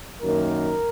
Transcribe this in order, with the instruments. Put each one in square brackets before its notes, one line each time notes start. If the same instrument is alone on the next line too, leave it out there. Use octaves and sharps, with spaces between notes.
[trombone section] F#2 D#3 A#3 A#4